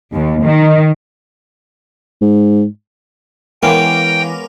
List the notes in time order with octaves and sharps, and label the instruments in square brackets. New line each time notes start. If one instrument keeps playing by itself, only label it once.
[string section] D#2
D#3
[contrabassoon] G#2
[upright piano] E3 [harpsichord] G#3 B3 C#4 [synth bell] A#4 F5 D6 [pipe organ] G5